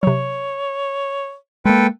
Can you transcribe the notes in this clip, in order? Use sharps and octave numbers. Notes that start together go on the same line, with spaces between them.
C3 F#3 C#5
G#3 A#3 A4 B4 G5